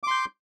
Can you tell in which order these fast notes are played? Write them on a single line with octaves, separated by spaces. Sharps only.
D6 C6 G6